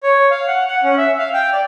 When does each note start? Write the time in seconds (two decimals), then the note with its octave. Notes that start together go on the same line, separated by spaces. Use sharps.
0.03 C#5
0.31 F5
0.47 F#5
0.68 F#5
0.83 C#4
0.97 E5
1.18 F5
1.34 G5
1.52 D5